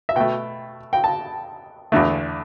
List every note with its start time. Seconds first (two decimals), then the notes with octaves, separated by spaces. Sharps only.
0.09 E5
0.16 B2 A3 G5
0.93 G5
1.04 A5
1.92 E2 D3 A3